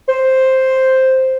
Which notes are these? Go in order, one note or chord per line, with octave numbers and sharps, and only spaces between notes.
C5